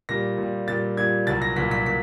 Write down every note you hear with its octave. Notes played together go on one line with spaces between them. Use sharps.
A#2 G3 A#6
A#2
G3
A#2 G3 A6
A#2 G3 G#6
C2 A#2 F#3 A6
A#6
C2 A#2 F#3 B6
B6
A#2 B6